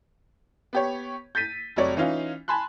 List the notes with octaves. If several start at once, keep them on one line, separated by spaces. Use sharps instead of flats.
B3 G4 C#5
G6 A6 B6 D#7
F1 C3 F#3 C#5 D5
E3 C#4 D#4 F4
G#5 A5 B5 C6 F#6